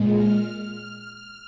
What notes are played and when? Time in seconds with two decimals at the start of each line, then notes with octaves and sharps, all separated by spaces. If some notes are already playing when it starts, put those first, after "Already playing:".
Already playing: A#2 G#3
0.16 F6